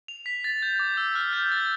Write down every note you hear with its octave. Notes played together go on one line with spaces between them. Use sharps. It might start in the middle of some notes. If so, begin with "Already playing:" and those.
F7
B6
A6
G6
D6
E6
F6
G6
A6